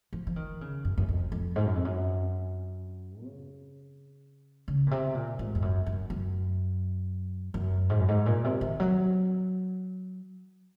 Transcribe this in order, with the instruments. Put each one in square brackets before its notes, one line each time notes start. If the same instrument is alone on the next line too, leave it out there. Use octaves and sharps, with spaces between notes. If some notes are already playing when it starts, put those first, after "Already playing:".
[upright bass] F3
F3
D#3
C#3
F#2
F#2
F2
F2
G#2
F#2
F2
F#2
C#3
C#3
A#2
C3
A#2
G#2
F2
F#2
F#2
F#2
F#2
G#2
F#2
G#2
A#2
C3
D#3
F#3